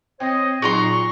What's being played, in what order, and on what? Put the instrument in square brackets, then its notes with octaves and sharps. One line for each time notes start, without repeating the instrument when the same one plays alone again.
[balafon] C4 G5 [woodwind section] C5 C#5 D#5
[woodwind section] A#2 C#6 [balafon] F#3 D#4 G#4 [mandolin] F#4 A#5 C6